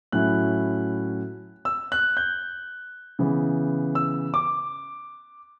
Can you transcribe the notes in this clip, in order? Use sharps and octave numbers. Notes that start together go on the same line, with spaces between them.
A2 F#3 C#4 E4 F#6
E6
F#6
G6
C#3 E3 B3
E6
D6